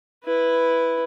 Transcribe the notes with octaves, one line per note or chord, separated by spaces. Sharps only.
E4 B4